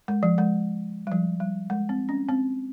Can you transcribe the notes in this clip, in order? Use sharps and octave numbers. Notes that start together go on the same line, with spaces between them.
G#3
F3
G#3
G3
F3
G3
G#3
C4
C#4
C4